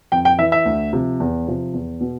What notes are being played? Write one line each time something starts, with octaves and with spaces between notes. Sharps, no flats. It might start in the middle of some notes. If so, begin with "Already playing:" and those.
F2 G5
G5
E3 E5
E5
D2
C3 F3
E2
C3 F3
E2
B2